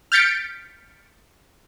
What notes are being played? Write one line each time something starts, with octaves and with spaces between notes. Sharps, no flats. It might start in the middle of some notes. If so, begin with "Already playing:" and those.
F6 G6 A6 B6 C#7 D7